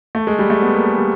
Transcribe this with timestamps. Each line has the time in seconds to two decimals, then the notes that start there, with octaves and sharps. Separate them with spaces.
0.15 A3
0.27 G#3
0.39 G3
0.50 A3
0.62 B3
0.74 A#3
0.85 G#3
0.98 G3